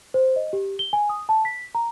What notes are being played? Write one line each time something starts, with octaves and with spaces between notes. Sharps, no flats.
C5
D#5
G4
G7
G#5
D#6
A5
B6
A#5